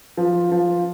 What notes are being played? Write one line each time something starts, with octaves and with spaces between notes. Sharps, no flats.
F3
F3